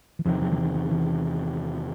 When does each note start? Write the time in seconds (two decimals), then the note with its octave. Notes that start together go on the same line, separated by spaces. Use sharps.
0.19 E3
0.25 E2 C3 D#3 F3
0.42 F3
0.52 F3
0.58 E3
0.75 E3
0.91 E3